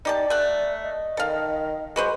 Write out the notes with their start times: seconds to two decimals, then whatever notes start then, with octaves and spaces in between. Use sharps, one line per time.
0.05 D#4 G4 D5 A5
0.30 A3 F#5
0.83 D#5
1.17 D#3 A4 F5
1.96 G#3 F#4 B4 C5